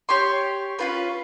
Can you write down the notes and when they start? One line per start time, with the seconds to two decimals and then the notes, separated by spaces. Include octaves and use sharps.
0.09 G4 C#5 C6
0.79 C#4 F4 B4